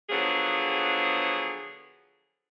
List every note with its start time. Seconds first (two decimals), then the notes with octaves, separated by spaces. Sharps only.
0.10 D3 F3 F#3 B3 G#4